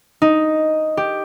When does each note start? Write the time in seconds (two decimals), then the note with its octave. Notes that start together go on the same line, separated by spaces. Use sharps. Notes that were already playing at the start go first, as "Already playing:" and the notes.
0.22 D#4
0.97 G4